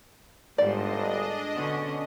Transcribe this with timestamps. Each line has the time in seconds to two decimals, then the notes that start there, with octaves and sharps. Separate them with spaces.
0.58 G1 G#2 G3 D4 C5 D5 D#5
1.13 G#4
1.54 B2 D3 C#4